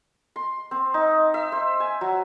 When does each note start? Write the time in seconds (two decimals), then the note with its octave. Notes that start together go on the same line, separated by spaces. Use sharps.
0.36 C6
0.71 C4
0.94 D#4
1.34 E5
1.52 C5
1.80 G#5
2.01 F#3